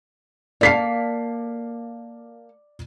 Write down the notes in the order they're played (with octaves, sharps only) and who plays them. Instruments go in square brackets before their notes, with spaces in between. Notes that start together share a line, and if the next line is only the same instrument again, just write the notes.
[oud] A#3 A4 F5 [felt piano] D5 B6 C7